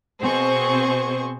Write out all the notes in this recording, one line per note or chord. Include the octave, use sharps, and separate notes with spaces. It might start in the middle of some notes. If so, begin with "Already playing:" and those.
B2 C4 G#4 C5 C#6